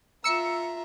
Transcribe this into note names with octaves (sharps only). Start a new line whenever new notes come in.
F4 E5 A#5 E6 C#7